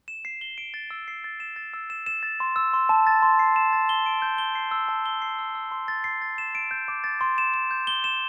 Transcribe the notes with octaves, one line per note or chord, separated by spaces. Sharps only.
E7
C7
G7
D7
A6
E6
C7
A6
E7
A6
E6
E7
E7
A6
C6
E6
C6
A5
A6
C6
C7
E7
A6
G7
D7
G6
G7
C7
E6
A5
G7
C7
E6
E6
C6
A6
C7
A6
E7
D7
G6
D6
A6
C6
E7
E7
G6
G7
E7